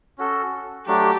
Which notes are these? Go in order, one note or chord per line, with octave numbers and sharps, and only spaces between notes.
C#4 F#4 A4
F#3 A3 D4 G4